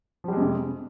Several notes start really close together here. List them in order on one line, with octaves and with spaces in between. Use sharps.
F3 G3 G#3 F2 C3